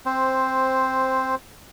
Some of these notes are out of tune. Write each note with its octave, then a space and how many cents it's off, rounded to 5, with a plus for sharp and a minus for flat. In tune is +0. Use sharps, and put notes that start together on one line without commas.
C4 +10 C5 +0